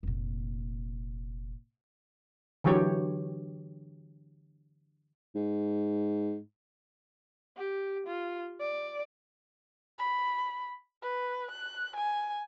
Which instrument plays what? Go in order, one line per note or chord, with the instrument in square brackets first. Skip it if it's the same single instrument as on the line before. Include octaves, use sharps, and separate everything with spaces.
[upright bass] F1 A#2
[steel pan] D3 E3 F#3 G4 C#5
[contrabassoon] G#2
[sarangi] G4
F4
D5
[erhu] B5
B4
F#6
G#5